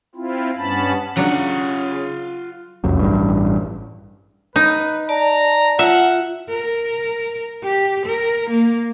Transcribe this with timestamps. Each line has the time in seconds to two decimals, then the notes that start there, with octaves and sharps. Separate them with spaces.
0.15 C4 E4 F4
0.57 G2 B3 C#4 A5 B5
1.16 C#3 F#3 D4 F4 F#5
2.84 F1 C#2 F#2
2.99 A1 G2
4.56 D#4 B4
5.09 D5 A5 A#5
5.79 F4 E5 F#5
6.49 A#4
7.63 G4
8.06 A#4
8.50 A#3